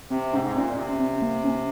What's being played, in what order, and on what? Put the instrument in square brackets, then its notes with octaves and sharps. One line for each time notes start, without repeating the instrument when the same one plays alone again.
[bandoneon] C3 [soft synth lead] C4
[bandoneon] G#2 [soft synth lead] C#4
[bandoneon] G#2
[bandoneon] A#2 [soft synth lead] C4
[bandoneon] A#2
C3
[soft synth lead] C#4
C4
A#3
C#4